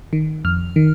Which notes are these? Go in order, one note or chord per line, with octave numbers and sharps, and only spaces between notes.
D#3
F2 F6
D#3